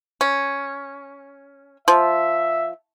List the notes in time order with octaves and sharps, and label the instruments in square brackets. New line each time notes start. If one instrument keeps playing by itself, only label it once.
[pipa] C#4
[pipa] F3 [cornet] E5